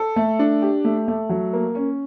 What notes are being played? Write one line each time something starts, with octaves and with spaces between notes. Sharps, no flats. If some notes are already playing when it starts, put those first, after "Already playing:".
Already playing: A4
A3
D4
G4
A3
A3
F#3
A#3
C#4